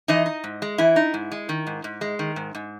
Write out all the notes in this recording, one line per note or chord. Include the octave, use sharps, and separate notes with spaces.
E3 D#4 D#5
D#4
G#2
G#3
E3 E4
D#4
G#2
G#3
D#3
G#2
G#2
G#3
D#3
G#2
G#2